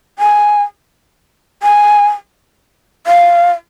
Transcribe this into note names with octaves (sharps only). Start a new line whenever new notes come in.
G#5
G#5
F5